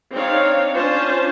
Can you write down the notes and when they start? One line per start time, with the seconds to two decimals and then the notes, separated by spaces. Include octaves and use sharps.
0.13 C4 D4 D#4 C#5 F5
0.75 C#4 D4 F4 C5 A5